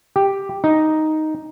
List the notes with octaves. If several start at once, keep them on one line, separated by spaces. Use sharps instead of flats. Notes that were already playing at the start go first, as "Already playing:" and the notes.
G4
D#4